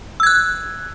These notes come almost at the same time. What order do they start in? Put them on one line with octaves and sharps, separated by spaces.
E6 G#6 F#6